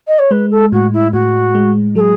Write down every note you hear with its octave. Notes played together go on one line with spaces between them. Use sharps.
D#5
C#5
G#3 B4
A4
A2 F#4
E4
A2 F#4
G#3
F#3 G#4 A4